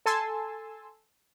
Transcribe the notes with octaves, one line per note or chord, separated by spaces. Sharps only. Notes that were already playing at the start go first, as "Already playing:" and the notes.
A4 G#5 A5 C6 E6